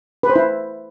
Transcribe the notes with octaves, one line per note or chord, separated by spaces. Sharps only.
B4
C5
E4